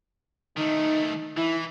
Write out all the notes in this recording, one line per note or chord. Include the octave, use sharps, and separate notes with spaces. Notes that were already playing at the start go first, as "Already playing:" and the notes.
D#3 A3 D#4
E3 E4